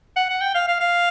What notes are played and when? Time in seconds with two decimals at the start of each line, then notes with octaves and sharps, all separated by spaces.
0.16 F#5
0.30 F#5
0.41 G5
0.55 F5
0.68 F5
0.80 F5